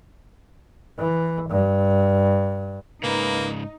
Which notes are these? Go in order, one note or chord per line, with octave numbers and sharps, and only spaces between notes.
E3
G2
G#2 C#3 A#3 D#4 B4